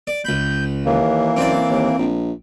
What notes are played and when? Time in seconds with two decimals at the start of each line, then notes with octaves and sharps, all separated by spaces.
0.07 D5
0.25 C#2 B5 G6
0.86 D#2 E3 A#3
1.37 F#1 C4 D5
1.70 D#2
1.99 A#1